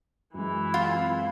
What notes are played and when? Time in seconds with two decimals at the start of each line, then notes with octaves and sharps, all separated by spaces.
0.34 F#2 E3 G#3 E4
0.74 C4 F4